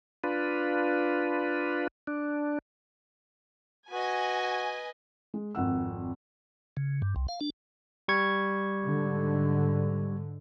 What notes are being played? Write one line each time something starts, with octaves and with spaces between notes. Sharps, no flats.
D4 F4 B4
D4
F#4 B4 D#5 G#5
G#3
G#1 F2 F#5 E6
C#3
G2
C2
F5
D4
G3 C#6 G#6
G#2 D3